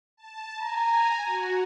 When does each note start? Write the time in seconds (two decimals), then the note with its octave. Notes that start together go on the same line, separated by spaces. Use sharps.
0.16 A5
0.62 G#5 A#5
1.25 F#4